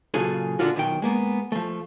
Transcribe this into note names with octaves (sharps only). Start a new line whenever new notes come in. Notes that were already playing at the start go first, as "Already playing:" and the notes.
A#2 C#3 F#3 F4 G#4 A4
A#2 D3 D4 F4 F#4
B1 D#3 G5
G#3 A#3 B3
F3 A3